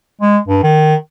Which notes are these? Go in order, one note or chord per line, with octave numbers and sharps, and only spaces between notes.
G#3
G2
D#3